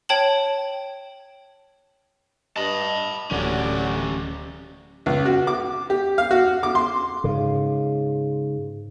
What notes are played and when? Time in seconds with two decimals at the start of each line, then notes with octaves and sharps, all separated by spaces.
0.09 C#5 G5 A5 F#7
2.56 G2 D#5 A5 B5
3.31 D1 F#3 C#4 F#4 G4 D5
5.06 C#2
5.26 F#4
5.47 D6
5.90 G4
6.18 F5
6.31 F#4
6.63 D6
6.75 C6
7.24 G#2 C#3